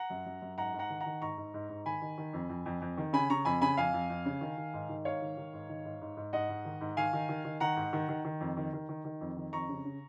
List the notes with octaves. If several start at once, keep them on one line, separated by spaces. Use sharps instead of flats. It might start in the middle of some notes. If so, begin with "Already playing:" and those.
Already playing: F#5 A#5
F#2
F#2
F#2
G#2 F#5 A#5
G#2
F#5 A#5
D#3
F#5 A#5
D#3
G#2 A#5 C#6
G#2
G#2
G#2
D#3 G#5 B5
D#3
D#3
F2
F2
F2
F2
D#3
C#3 G#5 B5
C#3 A#5 C#6
F2 G#5 B5
C#3 G#5 B5
F2 F5 G#5
F2
F2
C#3
D#3
D#3
G#2
D#3
G#2 C#5 F5
D#3
D#3
G#2
D#3
G#2
G#2
G#2
G#2 D#5 F#5
G#2
D#3
G#2
D#3 F5 G#5
D#3
D#3
D#3
D#3 F#5 A#5
G#2
D#3
D#3
D#3
F2
D#3
D#3
D#3
D#3
F2
D#3
F2 A#5 C#6
C#3
C#3